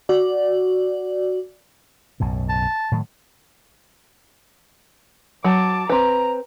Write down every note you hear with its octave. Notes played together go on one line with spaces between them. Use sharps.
F#4 D5
B1 F#2 A2
A5
A2 D#3 F#3
F#3 A5 D6
C4 B4 A#5